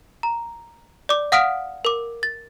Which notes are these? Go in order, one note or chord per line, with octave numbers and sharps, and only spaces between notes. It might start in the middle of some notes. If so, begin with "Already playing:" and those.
A#5
D5 D6
F5 F#5 D#6 F6 B6 D7
A#4 D6
A6